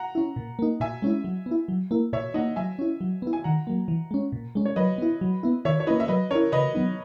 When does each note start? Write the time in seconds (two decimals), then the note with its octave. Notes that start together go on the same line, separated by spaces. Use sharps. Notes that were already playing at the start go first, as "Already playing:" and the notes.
Already playing: F#5 A#5
0.15 C#4 E4
0.36 A#2
0.59 A#3 D#4
0.80 A#2 E5 G#5
1.02 G#3 C#4 E4
1.24 F#3
1.46 B3
1.51 E4
1.68 F#3
1.91 A#3 E4
2.13 A#2 C#5 E5
2.34 A#3 D#4 D#5 F#5
2.56 F#3 E5 G#5
2.79 C#4 E4
3.01 F#3
3.22 B3 E4
3.33 G#5
3.44 D#3 F#5 A#5
3.67 F#3 A#3
3.88 E3
4.11 G#3 C#4
4.32 A#2
4.55 G#3 C#4
4.65 C#5
4.76 F#3 B4 D#5
4.98 B3 E4
5.21 F#3
5.43 B3 E4
5.65 D#3 C#5 E5
5.80 C#5
5.87 A#3 C#4 E4 B4 D#5
6.00 E5
6.08 F#3 B4 D#5
6.31 C#4 E4 A#4 C#5
6.52 C#3 B4 D#5
6.75 F#3 B3 D#4